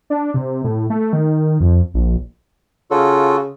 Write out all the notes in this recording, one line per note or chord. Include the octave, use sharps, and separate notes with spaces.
D4
C3
A2
A3
D#3
F2
A#1
C#3 F4 F#4 A4